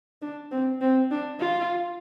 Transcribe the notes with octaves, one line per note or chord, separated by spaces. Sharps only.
D4
C4
C4
D4
F4